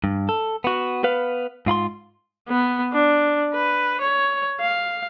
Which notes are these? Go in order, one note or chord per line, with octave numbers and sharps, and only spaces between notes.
G2
A4
B3 F#4
B3 B4 F5
G#2 F4 B5 C6
B3
D4
B4
C#5
F5